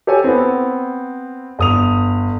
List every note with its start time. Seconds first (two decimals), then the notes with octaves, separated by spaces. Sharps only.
0.07 G4 A4 C#5 G#5
0.24 B3 C4
1.59 G1 D#6 F7